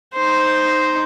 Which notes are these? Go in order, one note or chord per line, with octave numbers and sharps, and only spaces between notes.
D#4 C5